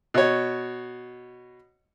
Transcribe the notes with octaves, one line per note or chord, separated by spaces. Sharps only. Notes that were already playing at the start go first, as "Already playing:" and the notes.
B2 C#5